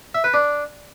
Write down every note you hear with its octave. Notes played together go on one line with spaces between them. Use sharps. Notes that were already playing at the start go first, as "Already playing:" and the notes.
E5
B4
D4